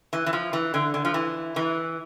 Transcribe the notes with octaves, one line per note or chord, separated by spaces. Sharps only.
E3
E3
F3
E3
D3
D3
F3
E3
E3